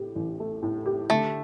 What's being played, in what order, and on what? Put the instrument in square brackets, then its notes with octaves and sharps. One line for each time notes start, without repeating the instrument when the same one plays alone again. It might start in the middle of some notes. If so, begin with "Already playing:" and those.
Already playing: [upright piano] A2 G4
A1
A3
A2
G4
[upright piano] D3 [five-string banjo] A3